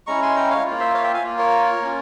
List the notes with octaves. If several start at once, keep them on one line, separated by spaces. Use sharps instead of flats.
G#3 C#4 E4 A#5 C#6
G#5 C6
G5 A#5
C#5 F5
A#3 F4
C5 E5
C#5 F5
E5 G5
F5 G#5
A#3 F4
A#4 C#5
A#3 C#4 F4